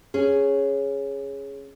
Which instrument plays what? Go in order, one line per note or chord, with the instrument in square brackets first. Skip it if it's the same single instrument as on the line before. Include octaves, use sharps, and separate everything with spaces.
[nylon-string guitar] C#4 G#4